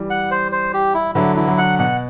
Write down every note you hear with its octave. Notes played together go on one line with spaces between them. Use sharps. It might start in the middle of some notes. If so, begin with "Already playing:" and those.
Already playing: E3 G3
F#5
C5
C5
G4
E4
D3 F#3 E4
E3 E4
D3 F#3
F#5
B2 F#5